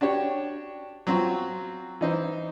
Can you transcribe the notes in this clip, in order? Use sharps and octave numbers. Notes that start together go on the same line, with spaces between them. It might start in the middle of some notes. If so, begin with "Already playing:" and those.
D4 F#4 G4 C#5
F#3 C4 F4 F#4
E3 D#4 C5